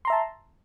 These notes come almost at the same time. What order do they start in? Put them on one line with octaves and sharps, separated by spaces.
C6 A#5 E5 A5